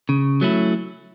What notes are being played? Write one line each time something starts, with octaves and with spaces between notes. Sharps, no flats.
C#3
F#3 A3 C#4 E4